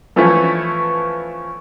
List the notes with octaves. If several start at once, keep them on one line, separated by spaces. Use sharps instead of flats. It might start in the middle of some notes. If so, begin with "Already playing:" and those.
E3 F3 A3 B3 C#4 E4